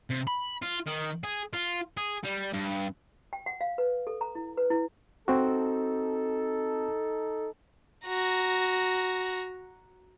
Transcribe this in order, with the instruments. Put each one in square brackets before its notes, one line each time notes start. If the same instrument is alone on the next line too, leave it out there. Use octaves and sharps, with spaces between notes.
[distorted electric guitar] C3
B5
F4
D#3
G#4
F4
G#4
G3
G2
[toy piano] G5
F#5
F5
B4
A4
A#5
E4
B4
E4
[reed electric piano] C4 F#4 [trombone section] D#4 A4
[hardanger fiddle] F#4 A#5